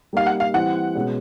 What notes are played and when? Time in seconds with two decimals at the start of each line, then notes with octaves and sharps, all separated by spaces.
0.13 G3 A#3 D#4 G4 F5
0.26 F#5
0.40 F5
0.53 E3 G3 C4 E4 F#5
0.95 B2 G#3 C#4